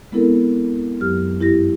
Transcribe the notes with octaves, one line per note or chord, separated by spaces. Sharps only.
G#3 B3 C4 E4 A4 A#4
F#2 F#3 G4 F6
G2 E4 G4 A#6